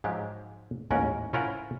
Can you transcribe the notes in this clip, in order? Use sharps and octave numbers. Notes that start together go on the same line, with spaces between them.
G#2 F3 F#3 G#3 G4
A1 D#2 G#2 C#4 A#4 F#5
C#4 E4 F4 A#4 C5 F#5